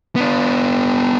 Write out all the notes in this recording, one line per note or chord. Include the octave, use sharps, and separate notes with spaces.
B3 D4